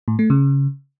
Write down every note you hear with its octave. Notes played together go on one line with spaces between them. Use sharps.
A2
A3
C#3